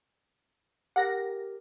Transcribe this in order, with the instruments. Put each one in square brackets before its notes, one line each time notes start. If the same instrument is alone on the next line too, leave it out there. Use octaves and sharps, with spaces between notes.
[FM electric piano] G4 A#4 [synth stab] F#5 A#6